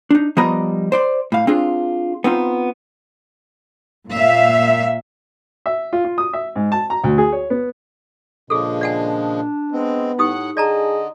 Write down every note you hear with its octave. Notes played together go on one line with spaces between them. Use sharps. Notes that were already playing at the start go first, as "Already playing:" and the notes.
D4 D#4
F3 G3 B3 D#5 A#5
C5 D5 C6
A2 F5
C4 D4 F4 G#4
B3 C4 D#4 F4
A#2 E5 F5
E5
F4
F4
D#6
E5
G#2
A5
A#5
D2
G#4
C#5
B3
A#2 C#3 F3 G#3 D4 G#4 A4
D5 F#5 G#5
G#3 B3 C4
A2 D#4 G4 F#5 D#6
D3 G#4 D5 D#5 A5 A#5